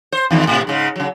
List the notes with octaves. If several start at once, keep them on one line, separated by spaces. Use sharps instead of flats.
C5
E2 D#3 G#3
A2 C3
G#2 C#3 G#3
C#3 F#3